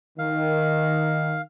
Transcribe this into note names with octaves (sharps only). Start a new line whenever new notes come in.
D#3 F5